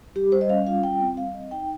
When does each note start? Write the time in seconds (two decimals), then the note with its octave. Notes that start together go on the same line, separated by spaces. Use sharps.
0.15 G3 G4
0.32 G3 C5
0.41 D#5
0.49 C#4 F5
0.67 F4 F5
0.83 G3 G5
1.00 C4
1.17 G3 F5
1.34 C4 D#5
1.51 D#4 G5